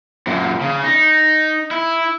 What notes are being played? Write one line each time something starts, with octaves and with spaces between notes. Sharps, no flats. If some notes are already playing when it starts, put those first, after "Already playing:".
F#2 A#2
C#3
D#4
E4